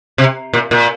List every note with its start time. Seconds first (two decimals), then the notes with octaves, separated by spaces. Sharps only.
0.18 C3
0.53 A#2
0.71 A#2